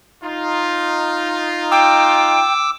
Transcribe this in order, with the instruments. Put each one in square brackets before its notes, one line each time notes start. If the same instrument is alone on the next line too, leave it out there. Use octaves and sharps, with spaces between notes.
[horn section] D#4 F4
[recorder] G5 [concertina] D6 E6